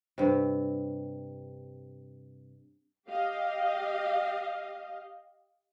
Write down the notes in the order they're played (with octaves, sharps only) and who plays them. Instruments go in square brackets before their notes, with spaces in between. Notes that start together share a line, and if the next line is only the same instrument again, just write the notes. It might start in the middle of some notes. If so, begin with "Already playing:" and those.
[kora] G2 C3
[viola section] G4 D#5 F5